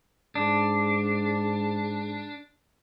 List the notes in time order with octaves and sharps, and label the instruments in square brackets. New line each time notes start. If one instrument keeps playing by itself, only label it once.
[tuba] G#2 [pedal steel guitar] D4